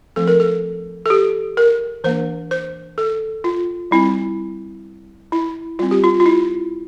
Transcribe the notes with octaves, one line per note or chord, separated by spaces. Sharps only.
F3 A3 C4 A4
A#4
A4
A4
G4
A#4
E3 A#3 D4 C5
C5
A4
F4
G3 C4 E4
E4
G3 C4 F4
G4
F4
F4
E4